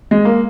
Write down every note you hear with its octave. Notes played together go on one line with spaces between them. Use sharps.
G#3
A#3